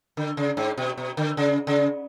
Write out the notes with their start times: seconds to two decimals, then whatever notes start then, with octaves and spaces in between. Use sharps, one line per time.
0.17 D3
0.37 C#3
0.57 G#2
0.78 B2
0.98 B2
1.17 D3
1.37 C#3
1.67 C#3